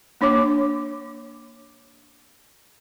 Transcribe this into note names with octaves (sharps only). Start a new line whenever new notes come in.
A#3 D4 C#5 D6